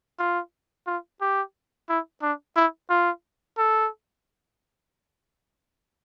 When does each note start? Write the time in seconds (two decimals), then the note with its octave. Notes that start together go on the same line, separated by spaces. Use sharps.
0.19 F4
0.87 F4
1.21 G4
1.89 E4
2.22 D4
2.56 E4
2.90 F4
3.58 A4